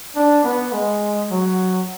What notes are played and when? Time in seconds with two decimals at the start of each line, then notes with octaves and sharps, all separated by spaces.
0.16 D4
0.44 B3
0.72 G#3
1.30 F#3